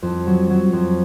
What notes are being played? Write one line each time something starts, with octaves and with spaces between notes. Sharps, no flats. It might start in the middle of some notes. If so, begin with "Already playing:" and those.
F2
F#3
F#3
F2